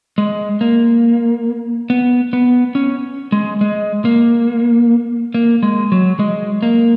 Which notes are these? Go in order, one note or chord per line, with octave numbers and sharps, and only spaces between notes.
G#3
A#3
B3
B3
C#4
G#3
G#3
A#3
A#3
G#3
F#3
G#3
A#3